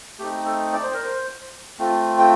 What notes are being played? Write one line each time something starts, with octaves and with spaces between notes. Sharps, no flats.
A3 C4 D#4 G4
A4
D5
C5
A#4
C5
A3 C4 F4
G5